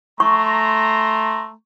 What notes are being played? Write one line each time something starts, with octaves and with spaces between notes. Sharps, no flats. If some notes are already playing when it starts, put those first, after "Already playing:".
A3 A#5 C6 C#6